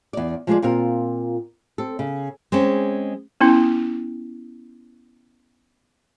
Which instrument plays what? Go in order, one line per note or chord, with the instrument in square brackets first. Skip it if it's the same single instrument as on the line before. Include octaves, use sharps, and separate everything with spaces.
[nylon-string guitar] E2 D5
F3 G#3 G#4 A#4 C5 D5
A#2 C4 F4 A#4
C4 A4
C#3
G#3 C4 C#4
[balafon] B3 C#4 E4